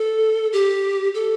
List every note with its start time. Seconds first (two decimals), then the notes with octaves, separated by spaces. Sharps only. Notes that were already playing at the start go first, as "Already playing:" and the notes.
Already playing: A4
0.53 G4
1.14 A4